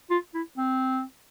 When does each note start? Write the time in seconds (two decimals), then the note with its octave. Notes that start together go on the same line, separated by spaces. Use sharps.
0.10 F4
0.34 E4
0.58 C4